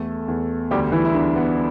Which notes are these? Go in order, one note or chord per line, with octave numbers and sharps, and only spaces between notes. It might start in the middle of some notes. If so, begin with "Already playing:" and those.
Already playing: E2 A3 A4
E2
D2 G3 G4
E3 E4
E4
D3 D4
B3